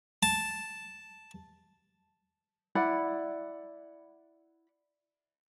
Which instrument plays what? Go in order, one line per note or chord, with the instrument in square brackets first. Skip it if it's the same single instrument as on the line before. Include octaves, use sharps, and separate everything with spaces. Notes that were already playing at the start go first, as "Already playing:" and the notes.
[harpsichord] A5
[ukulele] E4 D5 F#5 B5